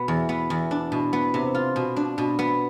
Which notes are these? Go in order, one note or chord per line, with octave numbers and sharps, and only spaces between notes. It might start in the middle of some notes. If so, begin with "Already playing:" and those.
Already playing: B2 B3
E2
B3
E2
D4
B2
B3
C3
F4
B2
D4
B2
B3